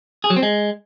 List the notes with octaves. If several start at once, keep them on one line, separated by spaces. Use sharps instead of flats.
G#4
F#3
C4
G#3